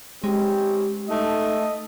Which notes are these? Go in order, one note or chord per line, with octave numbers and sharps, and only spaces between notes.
G#3 C4 C#4 D#4 G4
A3 D#4 A4 D#5